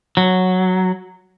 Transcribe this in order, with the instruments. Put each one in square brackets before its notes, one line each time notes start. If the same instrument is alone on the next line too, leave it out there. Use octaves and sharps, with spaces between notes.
[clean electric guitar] F#3